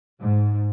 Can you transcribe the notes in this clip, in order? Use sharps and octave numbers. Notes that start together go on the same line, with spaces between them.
G#2